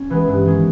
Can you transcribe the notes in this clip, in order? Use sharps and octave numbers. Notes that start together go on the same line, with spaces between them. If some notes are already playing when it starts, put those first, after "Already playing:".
Already playing: C#4
E3 G#3 B3 B4
G2
D#3 G#3 C#4